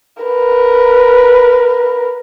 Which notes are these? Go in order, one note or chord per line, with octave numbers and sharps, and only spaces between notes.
A#4 B4